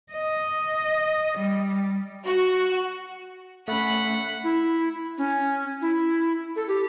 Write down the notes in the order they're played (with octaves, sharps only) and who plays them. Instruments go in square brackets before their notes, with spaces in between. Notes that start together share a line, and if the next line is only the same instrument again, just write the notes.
[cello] D#5
G3
[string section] F#4
[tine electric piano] A3 C#4 [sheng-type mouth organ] F#5 [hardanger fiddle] B5
[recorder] E4
C#4
E4
A4
G4